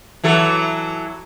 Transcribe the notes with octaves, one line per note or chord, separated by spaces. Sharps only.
E3 F#3 A4